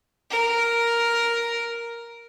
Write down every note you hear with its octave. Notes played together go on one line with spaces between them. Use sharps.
A#4